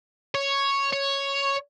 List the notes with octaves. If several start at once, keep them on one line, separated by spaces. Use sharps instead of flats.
C#5
C#5